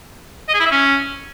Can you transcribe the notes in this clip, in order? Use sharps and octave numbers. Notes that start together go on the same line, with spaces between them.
D#5
G#4
E4
E5
C#4